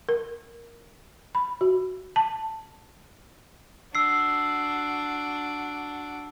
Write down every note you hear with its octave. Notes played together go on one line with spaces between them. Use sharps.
A#4
B5
F#4
A5
D4 F#4 E6 C7